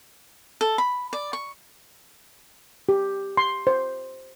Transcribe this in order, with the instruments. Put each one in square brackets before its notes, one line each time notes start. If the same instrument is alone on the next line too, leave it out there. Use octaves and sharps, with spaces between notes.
[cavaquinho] A4
B5
D5
C#6
[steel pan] G4
C6
C5